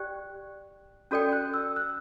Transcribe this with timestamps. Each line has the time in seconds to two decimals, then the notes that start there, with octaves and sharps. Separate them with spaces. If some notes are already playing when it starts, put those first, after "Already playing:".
Already playing: G4 D5 G5 F#6
1.11 C#4 F#4 A4 D5 G5 G6
1.32 F#6
1.54 E6
1.76 F#6